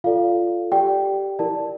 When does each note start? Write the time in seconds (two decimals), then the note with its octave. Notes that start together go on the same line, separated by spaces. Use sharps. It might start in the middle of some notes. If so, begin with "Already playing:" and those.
0.04 F4 A4 D5 F5
0.72 G4 D5 G5
1.39 E4 A#4 D5 A5